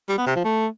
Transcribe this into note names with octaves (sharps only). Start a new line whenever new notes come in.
G3
B3
C3
F3
A3